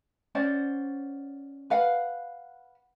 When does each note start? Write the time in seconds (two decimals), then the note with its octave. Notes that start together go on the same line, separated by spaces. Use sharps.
0.35 C#4 C5 D5 F#5
1.70 B4 F5 F#5